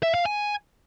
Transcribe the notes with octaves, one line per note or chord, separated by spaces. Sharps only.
E5
F5
G#5